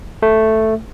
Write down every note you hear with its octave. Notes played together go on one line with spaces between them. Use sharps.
A3